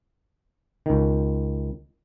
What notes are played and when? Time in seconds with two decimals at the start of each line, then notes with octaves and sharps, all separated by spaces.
0.86 C#2 D#3